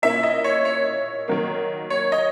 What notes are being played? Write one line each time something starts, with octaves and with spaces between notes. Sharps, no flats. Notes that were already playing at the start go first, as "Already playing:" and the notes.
A#2 A#3 C#4 E4 E5
D#5
C#5
C#5
D#3 F#3 A#3
C#5
D#5